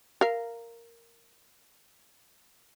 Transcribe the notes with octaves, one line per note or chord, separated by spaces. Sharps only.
A#4 F5